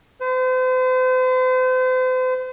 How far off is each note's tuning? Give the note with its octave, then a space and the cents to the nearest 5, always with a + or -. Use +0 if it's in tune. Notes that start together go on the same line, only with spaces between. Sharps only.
C5 -40